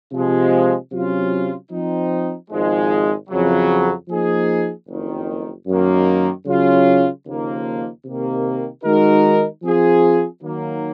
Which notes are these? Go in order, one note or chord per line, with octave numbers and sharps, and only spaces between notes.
C3 F3 G#3
C3 F#3 C#4 F4
F3 C4 D#4
G#1 G#2 F3 G#3
F2 C#3 F#3
F3 A#3 D#4 G#4
F#1 F2 D#3
F#2 D#3 A#3
C#3 F#3 C#4 F4
D#2 C#3 F3 A#3 D#4
C3 D#3 A#3
D#3 G#3 D#4 F#4 A#4
F3 C4 F4 G#4
D#3 F#3 A#3